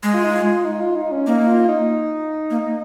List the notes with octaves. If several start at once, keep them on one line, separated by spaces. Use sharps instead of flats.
G#3
F4
D#4
F4
D#4
F4
D#4
C#4
A#3 D#4
F4
D#4
A#3